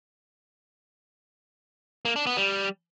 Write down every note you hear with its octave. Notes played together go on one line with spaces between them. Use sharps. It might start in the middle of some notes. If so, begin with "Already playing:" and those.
A#3
D4
B3
G3